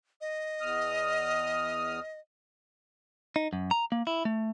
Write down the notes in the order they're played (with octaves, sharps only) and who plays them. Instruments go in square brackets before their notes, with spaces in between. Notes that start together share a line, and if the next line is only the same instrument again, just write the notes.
[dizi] D#5
[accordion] E2 D#6 F6
[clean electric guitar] D#4
F#2
A#5
A#3
E4
A3